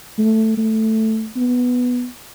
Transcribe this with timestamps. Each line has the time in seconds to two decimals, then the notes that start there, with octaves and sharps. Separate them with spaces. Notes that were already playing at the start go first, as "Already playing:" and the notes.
0.18 A3
0.57 A3
1.36 B3